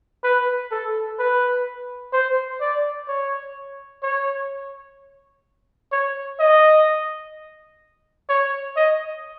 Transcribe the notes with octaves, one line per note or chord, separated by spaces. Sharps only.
B4
A4
B4
C5
D5
C#5
C#5
C#5
D#5
C#5
D#5